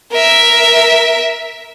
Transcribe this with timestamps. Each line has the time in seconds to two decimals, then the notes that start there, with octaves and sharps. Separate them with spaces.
0.12 A#4 E5